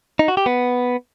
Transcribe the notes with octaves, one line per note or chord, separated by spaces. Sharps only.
D#4
F#4
G4
B3